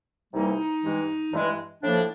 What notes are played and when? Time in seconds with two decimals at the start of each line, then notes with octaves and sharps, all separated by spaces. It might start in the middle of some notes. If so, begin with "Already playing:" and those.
0.34 C2 C3 E3 G3 A#3 D#4
0.83 G2 E3 G#3
1.33 G2 E3 G#3
1.83 A2 F3 A#3 D4